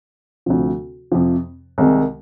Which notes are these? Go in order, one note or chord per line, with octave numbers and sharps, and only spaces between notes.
D2 C3 F3
F2 C3 F3
C2 C3 D#3 G#3